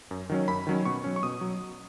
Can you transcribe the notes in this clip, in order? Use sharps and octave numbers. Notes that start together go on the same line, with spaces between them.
F#2
D#3 F#3 C#4
F#2 B5
D#3 F#3 C#4
B2 C#6
F#3 C#4
C#6
B2 D#6
F#3